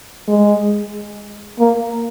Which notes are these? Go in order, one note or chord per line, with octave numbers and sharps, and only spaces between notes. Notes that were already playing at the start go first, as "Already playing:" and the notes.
G#3
A#3